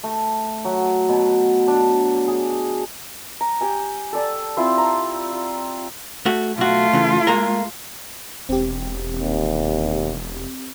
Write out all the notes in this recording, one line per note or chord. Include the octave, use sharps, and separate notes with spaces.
A3
F#3
B2
D4
G#4
A#5
G4 G5 G#5
A4 D5 A5
C4 E4 F4 C5
A#5 C6
F4
A3 F#4
B1 A3 F4 F#4
C#3 E3
G#3 A#3 A#4
E1 C4 G4
D#2